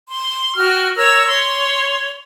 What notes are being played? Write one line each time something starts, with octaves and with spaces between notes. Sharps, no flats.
C6
F#4 G5 F6
A#4 C#5 E6
C#5 C6